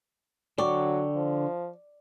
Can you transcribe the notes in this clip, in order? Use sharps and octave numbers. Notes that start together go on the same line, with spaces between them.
D3 F#3 D5 G5 C#6
F3